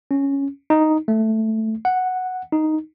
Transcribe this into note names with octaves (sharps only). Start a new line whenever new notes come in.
C#4
D#4
A3
F#5
D#4